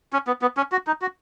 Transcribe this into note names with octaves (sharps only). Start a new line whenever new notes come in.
C#4
B3
B3
C#4
F#4
D#4
F#4